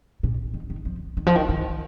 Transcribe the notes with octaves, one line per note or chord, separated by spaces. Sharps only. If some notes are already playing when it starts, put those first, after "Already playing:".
A#2
D#3
D#3
F3
D#3
F3
D#3
D#3